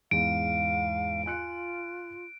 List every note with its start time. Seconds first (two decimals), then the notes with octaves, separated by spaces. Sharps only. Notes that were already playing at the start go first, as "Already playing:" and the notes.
0.11 E2 G#2 F5 D7
1.26 F4 G#5 F#6 C#7